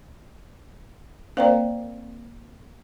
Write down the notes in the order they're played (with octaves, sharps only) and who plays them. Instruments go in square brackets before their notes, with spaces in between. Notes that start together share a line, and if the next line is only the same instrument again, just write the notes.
[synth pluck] A#3 C4 [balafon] C5 D5 [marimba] F5 G5 A#5